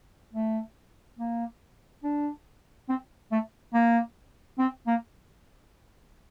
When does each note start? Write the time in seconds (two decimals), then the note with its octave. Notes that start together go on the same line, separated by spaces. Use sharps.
0.33 A3
1.19 A#3
2.03 D4
2.89 C4
3.32 A3
3.73 A#3
4.58 C4
4.87 A#3